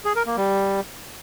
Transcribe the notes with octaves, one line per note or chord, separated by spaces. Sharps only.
G#4
A#4
A#3
G3